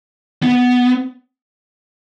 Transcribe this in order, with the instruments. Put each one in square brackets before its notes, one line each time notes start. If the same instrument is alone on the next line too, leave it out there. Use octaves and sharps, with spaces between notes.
[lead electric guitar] B3